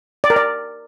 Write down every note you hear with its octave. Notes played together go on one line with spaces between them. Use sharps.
D5
A#4
D5